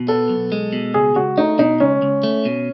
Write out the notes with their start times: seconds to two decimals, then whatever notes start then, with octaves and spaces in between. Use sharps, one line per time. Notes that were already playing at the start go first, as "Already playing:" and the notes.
Already playing: B2
0.08 B3 A4
0.29 B1
0.52 G#3
0.73 B2
0.94 C#2 G#4
1.15 C#2 F#4
1.38 A3 D#4
1.59 B2 D#4
1.80 C#2 C#4
2.02 C#2
2.23 A3
2.45 B2